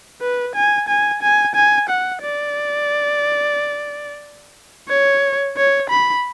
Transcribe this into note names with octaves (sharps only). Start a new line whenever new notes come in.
B4
G#5
G#5
G#5
G#5
F#5
D5
C#5
C#5
B5